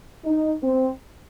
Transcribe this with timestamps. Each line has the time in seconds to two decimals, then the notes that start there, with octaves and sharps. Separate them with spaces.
0.25 D#4
0.63 C4